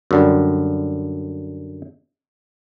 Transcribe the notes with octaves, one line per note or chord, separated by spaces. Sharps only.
F#2 D3 G3